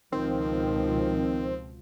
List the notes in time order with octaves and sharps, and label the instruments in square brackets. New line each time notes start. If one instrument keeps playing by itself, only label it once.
[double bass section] C#2 B2 F3 [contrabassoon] D#3 [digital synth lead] C4